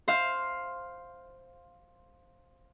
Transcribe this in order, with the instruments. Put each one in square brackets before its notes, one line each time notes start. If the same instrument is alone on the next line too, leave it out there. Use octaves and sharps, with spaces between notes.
[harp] C5 F5